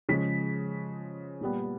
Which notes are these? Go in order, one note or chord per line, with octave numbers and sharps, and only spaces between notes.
C#3 F3 G#3 B6
A#2 G3 B3